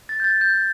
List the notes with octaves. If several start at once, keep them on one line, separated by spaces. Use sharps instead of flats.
A6
G6
A6
G6